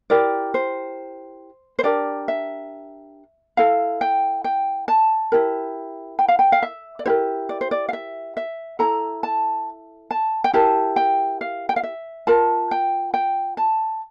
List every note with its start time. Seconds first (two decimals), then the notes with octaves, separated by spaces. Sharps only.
0.10 E4 G4 A#4 D5
0.54 C5
1.79 C5
1.83 D4 G4 A#4 D5
2.28 E5
3.57 E4 A4 F5
4.01 G5
4.44 G5
4.88 A5
5.32 E4 G4 A#4
6.19 G5
6.28 F5
6.39 G5
6.52 F5
6.62 E5
6.99 D5
7.06 E4 G4 A#4 C5
7.49 D5
7.61 C5
7.71 D5
7.89 F5
7.93 E5
8.37 E5
8.79 E4 A4 A#5
9.23 A5
10.11 A5
10.44 G5
10.53 E4 G4 A#4 A5
10.96 G5
11.41 F5
11.69 G5
11.76 F5
11.83 E5
12.27 F4 A#4 A5
12.71 G5
13.14 G5
13.57 A5